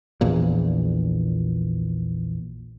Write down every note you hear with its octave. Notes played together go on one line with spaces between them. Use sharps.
A#1 E2 A#2